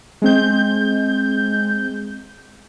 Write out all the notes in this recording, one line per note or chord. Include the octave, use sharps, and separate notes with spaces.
G#3 C4 G6